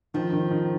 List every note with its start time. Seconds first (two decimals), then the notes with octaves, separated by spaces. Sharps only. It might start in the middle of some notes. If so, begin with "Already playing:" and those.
0.14 D#3 F3
0.33 D#3
0.51 D#3